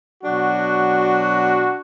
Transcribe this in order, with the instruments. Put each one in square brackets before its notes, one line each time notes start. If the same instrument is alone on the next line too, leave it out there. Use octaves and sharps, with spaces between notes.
[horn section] B2 F#3 D4 F#4